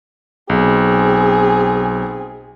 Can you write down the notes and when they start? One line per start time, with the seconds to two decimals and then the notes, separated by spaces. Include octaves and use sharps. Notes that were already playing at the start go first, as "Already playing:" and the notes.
0.49 B1 C4 G#4